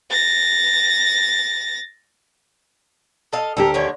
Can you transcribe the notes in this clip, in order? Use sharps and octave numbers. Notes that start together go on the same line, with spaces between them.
A6 A#6
A4 D#5 F5
D2 G4 A4 A#4
D3 D#3 C#5